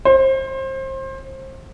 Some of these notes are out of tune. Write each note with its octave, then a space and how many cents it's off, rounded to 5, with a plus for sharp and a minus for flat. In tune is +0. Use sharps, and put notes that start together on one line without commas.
C5 +30